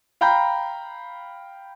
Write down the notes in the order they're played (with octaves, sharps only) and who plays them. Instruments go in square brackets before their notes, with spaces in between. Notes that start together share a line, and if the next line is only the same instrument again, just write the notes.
[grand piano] F5 G5 A#5 B5 G6